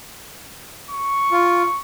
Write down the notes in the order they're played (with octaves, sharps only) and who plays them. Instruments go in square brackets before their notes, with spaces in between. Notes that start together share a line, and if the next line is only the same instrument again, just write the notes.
[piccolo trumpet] C#6
[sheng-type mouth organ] F4